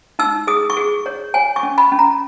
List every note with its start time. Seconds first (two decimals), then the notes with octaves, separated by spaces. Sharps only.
0.19 D#4 E6
0.47 G#4 D#6
0.70 C#6
0.77 G#4
1.06 C#5
1.34 C#5 G#5
1.56 C#6
1.63 C#4
1.78 B5
1.92 C#4
1.99 A#5